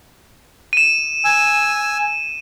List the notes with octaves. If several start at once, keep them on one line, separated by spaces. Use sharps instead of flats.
D#7 E7
G#5 E6